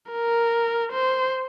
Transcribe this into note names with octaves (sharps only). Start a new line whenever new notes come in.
A#4
C5